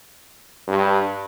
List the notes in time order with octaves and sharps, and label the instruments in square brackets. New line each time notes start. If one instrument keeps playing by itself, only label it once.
[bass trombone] G2